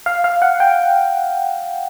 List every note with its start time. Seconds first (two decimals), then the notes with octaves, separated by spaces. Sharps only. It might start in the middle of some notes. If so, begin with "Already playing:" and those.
0.06 F5
0.24 F5
0.42 F#5
0.60 G5